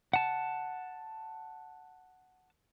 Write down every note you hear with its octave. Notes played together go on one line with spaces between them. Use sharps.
F#5 A5